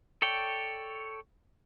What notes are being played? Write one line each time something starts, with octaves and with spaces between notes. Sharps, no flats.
A4 C#5 D5 G5